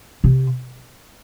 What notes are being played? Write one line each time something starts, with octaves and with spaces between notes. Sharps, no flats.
C3